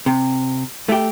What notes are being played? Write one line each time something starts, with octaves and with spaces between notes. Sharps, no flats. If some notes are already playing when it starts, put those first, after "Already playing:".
C3
A3 G4